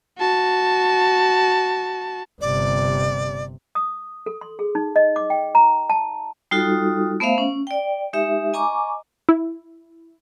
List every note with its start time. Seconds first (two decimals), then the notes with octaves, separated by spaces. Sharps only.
0.18 F#4 A5
2.41 G1 C3 D5
3.75 D#6
4.26 A4
4.41 C6
4.59 G#4
4.75 D#4
4.96 D#5
5.16 D6
5.30 G5
5.55 A#5
5.90 A5
6.51 G3 D#4 F4 F#4 A4 D#6
7.20 A3 B3 C5 E5 F5
7.38 C#4
7.67 D5 G5
8.13 G#3 D#4 G4 E5
8.53 D#5 G#5 A#5 C#6 D6
9.29 E4